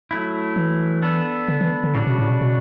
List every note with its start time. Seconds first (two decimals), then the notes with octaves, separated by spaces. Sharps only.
0.11 F#3 A3 E4
0.56 E3
1.02 B3 D4 A4
1.48 D3
1.61 E3
1.84 D3
1.95 A2 C#3 G3 D4 F#4
2.07 B2
2.18 A2
2.29 B2
2.41 B2